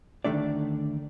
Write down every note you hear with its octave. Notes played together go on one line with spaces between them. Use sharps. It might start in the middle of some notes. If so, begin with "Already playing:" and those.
D2 D#3 A3 D4 D5